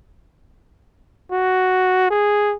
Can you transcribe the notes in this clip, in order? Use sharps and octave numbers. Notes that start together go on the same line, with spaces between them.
F#4
G#4